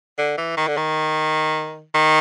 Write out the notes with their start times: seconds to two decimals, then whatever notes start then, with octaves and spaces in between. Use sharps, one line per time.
0.18 D3
0.38 E3
0.57 D#3
0.68 D3
0.77 D#3
1.95 D#3